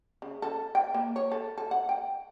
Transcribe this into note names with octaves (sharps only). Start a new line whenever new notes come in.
C#3
A4
G5
A#3
C#5
A4
A4
F#5
G5